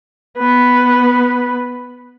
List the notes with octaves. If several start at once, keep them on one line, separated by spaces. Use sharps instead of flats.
B3 B4